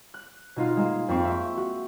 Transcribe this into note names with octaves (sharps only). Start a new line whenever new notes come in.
F#6
B2 D#4 F4
G#3 A#3
F2 C4 C#6 D7
E5
F#4